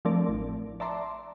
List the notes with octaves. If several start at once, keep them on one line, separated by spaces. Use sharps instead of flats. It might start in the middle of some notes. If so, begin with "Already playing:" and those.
F3 A3 C4 D4 A#4 D5
A1
D5 E5 A5 A#5 C6 D6